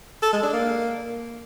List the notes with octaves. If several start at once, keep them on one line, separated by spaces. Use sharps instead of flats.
A4
G#3
D4
A#3